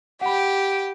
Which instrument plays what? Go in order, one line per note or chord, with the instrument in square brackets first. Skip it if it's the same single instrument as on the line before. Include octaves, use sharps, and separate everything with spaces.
[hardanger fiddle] G4 G5 [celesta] F#5 B5